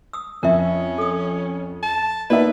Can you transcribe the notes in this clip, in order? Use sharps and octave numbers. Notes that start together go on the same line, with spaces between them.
D#6 E6
F2 C#4 A#4 E5
A4 D#6
A5
A#3 D#4 B4 D5 E5